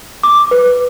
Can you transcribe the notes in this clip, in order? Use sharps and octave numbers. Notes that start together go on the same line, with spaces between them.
D6
B4